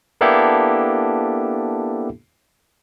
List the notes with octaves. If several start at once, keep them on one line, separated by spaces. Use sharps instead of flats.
A#3 B3 D4 E4 G4 A4